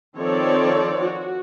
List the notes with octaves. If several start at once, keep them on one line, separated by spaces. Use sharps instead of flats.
D#3 F3 C4 A4 C#5 D5
F#4